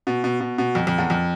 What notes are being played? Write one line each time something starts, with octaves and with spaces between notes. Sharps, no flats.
B2
B2
B2
B2
F2
F2
E2
F2